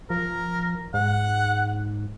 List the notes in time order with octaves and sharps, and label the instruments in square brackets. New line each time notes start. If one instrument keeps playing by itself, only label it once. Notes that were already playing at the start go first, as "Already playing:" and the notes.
[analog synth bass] F3 [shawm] A#4
[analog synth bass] G#2 [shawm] F#5